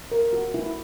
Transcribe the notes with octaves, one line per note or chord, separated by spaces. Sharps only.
A#4
F#4
E4